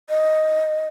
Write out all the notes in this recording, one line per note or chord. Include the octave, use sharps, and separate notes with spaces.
D#5